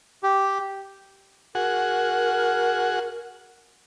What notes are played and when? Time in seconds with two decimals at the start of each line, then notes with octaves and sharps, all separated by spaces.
0.23 G4
1.55 F#4 G#4 A#4 F#5